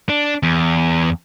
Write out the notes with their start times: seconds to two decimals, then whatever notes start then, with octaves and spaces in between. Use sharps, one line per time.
0.09 D4
0.43 E2